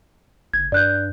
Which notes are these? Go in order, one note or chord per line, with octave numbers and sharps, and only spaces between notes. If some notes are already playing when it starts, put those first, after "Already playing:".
F#1 G#6
G2 D5 F#6 G6